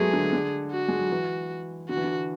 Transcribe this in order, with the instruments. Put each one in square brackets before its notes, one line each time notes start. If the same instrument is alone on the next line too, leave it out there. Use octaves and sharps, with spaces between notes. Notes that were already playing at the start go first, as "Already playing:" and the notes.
Already playing: [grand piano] F#3 G#3 A3 B3 [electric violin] G#4
[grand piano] D3
D3
[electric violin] F#4
[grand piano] G#3
F#3
E3
[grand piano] D3 [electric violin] F#4
[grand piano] E3
D3